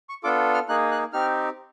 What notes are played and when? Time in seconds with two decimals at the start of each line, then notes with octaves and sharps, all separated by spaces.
0.09 C#6
0.24 B3 D4 F4 A4 D6
0.54 F6
0.69 A#3 D#4 G#4 F#6
0.91 F#6
1.13 C4 D#4 G4 F6